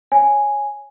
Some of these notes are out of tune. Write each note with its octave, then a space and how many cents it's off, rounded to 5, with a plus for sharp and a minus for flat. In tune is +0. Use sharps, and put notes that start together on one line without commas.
C#5 +0 G#5 +0